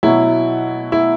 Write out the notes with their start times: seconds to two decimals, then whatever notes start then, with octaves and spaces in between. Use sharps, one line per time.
0.03 B2 F#3 E4
0.92 E4